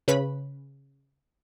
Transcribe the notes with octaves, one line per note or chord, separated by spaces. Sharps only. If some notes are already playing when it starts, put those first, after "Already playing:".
C#3 C#4 B4 B5